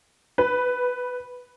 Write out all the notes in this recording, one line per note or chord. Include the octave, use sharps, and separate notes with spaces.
B4